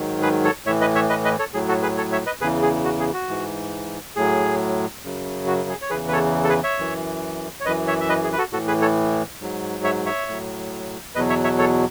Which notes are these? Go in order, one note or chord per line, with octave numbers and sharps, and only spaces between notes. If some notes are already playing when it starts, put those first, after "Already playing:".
Already playing: G#2 D#3 F#3
G#4 B4
A4 C#5
A2 E3 C#5 E5
B4 D#5
C#5 E5
B4 D#5
B4 D#5
A4 C#5
A2 F#3 G#4
F#4 A4
G#4 B4
A4 C#5
C#5 E5
B4 D#5
E2 C#3 E3 G#4 B4
G#4
F#4
G#4
F#4
G#2 E3
A2 F#3 G#4
F#2 C#3 F#3
F#4
G#4
C#5
E2 C#3 E3 G#4 B4
B4
A4 C#5
A4
G#4 B4
C#5 E5
F#2 E3
C#5
F#2 E3 B4 D#5
C#5 E5
E5
B4 D#5
G#4
B4
F#4 A4
A2 E3 F#4 A4
G#4 B4
A4 C#5
G#2 F#3
C#5 E5
C#5 E5
A2 F#3
E2 B2 F#3 B4 D#5
C#5 E5
C#5 E5
A4 C#5